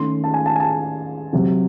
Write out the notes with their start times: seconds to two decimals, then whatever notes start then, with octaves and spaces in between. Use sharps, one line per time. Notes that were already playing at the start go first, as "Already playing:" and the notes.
Already playing: D#3 A3 C#4 C6
0.24 A5
0.34 G#5
0.46 A5
0.56 G#5
0.60 A5
1.33 C3 F#3 C4